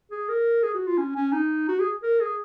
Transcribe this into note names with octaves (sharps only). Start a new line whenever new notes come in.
G#4
A#4
G#4
F#4
F4
C#4
C#4
D#4
F#4
G#4
A#4
G#4